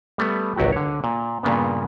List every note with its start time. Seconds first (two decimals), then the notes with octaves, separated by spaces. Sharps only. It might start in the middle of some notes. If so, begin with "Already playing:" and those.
0.18 G3 A3 B3
0.56 G#1 C#2 F#3 F#4 G4
0.73 D3 C#5
1.04 A#2
1.43 G2 A#2 C#3 A#3 B3